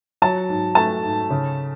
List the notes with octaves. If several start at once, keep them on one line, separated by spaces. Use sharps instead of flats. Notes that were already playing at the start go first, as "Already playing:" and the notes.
F#3 A5
G#2
A3 A5
G#2
C#3